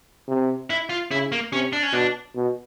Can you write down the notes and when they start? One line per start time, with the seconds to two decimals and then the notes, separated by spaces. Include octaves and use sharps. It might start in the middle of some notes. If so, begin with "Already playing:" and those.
0.28 C3
0.70 E4
0.90 F4
1.11 C#3 E4
1.32 A#3
1.52 C3 C#4
1.73 D4
1.83 C#4
1.93 B2 D4
2.35 B2